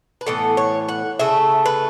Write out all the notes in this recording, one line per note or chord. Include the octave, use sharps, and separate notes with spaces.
B4
A2 E3 B3 A4
C#5
F#5
C#3 A3 E5
B4